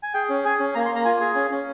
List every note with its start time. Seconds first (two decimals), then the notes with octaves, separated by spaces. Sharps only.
0.03 G#5
0.14 G#4 G5
0.29 C#4
0.45 G#4 G#5
0.59 C#4
0.75 A#3 A#5
0.85 C6
0.91 A#3
0.96 A#5
1.05 F4 G#5
1.20 G#4 G#5
1.35 C#4
1.51 C#4